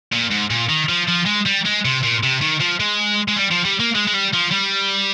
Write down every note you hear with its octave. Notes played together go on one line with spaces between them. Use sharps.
A#2
G#2
A#2
D#3
F3
F3
G#3
G3
G#3
C3
A#2
C3
D#3
F3
G#3
G#3
G3
F3
G3
A#3
G#3
G#3
G3
F3
G3